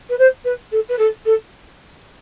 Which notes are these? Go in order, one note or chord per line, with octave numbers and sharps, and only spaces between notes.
B4
C5
B4
A4
B4
A4
A4